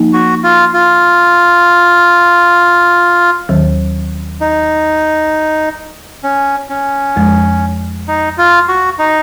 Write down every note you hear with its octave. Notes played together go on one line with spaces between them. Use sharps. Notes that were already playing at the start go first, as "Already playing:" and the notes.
Already playing: F3 A#3 D#4
F#4
F4
F4
D#2 D#3 F#3
D#4
C#4
C#4
F2 F3 G#3
D#4
F4
F#4
D#4